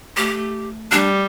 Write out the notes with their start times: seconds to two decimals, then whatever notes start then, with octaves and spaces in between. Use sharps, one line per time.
0.17 A3 G4
0.92 G3 D4